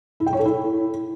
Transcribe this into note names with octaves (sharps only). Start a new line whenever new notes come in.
E4
G5
C#5
A4
E4